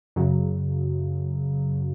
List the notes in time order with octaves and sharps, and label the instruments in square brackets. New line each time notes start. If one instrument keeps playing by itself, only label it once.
[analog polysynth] F#2 C#3 F#3